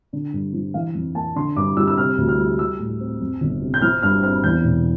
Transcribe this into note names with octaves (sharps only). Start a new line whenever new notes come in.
D3
G2
F3
E3 F5
F2
A#3 A5
D3 C6
G2 D6
G3 E6
E6
C3 F6
D2
F6
G3
G3 E6
A2
C4
F2
G1
C3
G6
F3 F6
G2 F6
C4 F6
E2 G6
E1